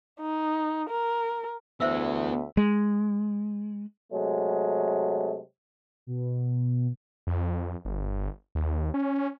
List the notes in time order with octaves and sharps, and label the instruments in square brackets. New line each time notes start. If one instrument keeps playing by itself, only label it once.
[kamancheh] D#4
A#4
[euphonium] D2 [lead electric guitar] B3 E4 [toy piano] C5 E5 E6
[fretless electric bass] G#3
[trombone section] C3 F#3 G#3 A3
[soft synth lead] B2
[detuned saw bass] F2
G1
D#2
C#4